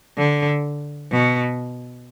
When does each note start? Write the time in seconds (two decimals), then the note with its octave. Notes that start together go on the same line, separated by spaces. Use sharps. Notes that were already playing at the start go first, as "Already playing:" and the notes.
0.18 D3
1.11 B2